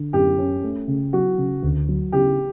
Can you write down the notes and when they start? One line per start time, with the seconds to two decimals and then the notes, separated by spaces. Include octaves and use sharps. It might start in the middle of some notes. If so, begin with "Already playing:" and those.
Already playing: D3
0.13 F#2 G4
0.39 C#4
0.63 A3
0.88 C#3
1.13 F#3 F#4
1.38 C#3
1.63 D2
1.89 F#3
2.12 C#3 G4